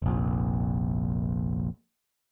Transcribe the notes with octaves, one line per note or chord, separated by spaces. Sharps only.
F1 A#1